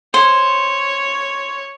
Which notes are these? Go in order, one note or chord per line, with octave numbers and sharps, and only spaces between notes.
C5 C#5